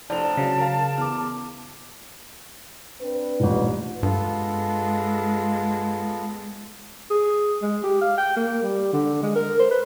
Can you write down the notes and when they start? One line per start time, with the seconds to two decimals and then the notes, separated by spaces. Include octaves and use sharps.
0.10 F1 A2 D4 C5 A5 F7
0.37 C#3 F#3
0.58 A#4 F5
0.98 E2 D6 F6
3.00 C4 D4 B4
3.40 D#1 A1
4.03 G2 G#3 B3 F4 A4
7.11 G#4
7.62 G#3
7.84 G4
8.01 F5
8.18 G5
8.36 A#3
8.62 G3
8.93 D3
9.22 G#3
9.36 A#4
9.59 C5
9.71 B4